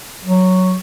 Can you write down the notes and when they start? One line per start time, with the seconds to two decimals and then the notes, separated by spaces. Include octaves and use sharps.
0.24 F#3